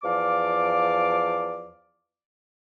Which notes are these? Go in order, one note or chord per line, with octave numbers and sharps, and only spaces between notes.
E2 F3 D5 F5 D6